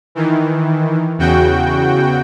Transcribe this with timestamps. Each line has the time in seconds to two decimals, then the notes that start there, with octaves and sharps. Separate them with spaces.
0.15 D#3 E3
1.18 E2 C#3 F#4 G5